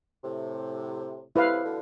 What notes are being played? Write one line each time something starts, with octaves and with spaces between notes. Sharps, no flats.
A2 C3
A2 C3 E4 B4 F5
B2 D3